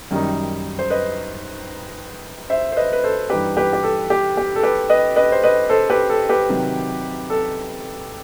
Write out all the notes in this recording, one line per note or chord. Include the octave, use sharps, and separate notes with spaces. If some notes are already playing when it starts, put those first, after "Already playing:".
F#2 D#3 G3 D#4
C5
B4 D#5
C5 E5
C5
B4 D#5
B4
A4 C5
G2 E3 G3 D#4 G4 B4
G4 B4
G4
A4
G4
G4
A4
G4 B4
B4 D#5
B4 D#5
C5
B4 D#5
A4 C5
G4 B4
A4
G4 B4
C3 D#3 F#3
A4